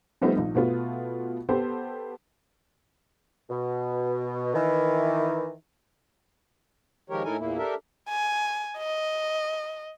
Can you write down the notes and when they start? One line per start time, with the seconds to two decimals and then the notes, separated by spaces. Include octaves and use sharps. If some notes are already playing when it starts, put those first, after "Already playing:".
0.21 F3 G3 A3 B3 C4 D#4
0.37 A#1 D#4
0.55 B2 A3 B3 F4
1.49 B3 G4 A4 C5
3.50 B2
4.54 D#3 E3
7.10 D#3 F3 G#3 G4 A#4 C#5
7.24 A2 D#4 E4 A4 A#4 G#5
7.39 E2 A#2 A#3 E4
7.58 D4 G4 A4 A#4 E5
8.09 G#5
8.78 D#5